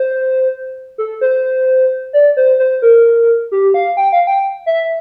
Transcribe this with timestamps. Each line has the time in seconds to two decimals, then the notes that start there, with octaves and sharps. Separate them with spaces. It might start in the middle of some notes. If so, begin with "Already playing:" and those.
Already playing: C5
0.98 A4
1.21 C5
2.13 D5
2.37 C5
2.59 C5
2.82 A#4
3.52 G4
3.74 F5
3.97 G5
4.12 F5
4.27 G5
4.66 E5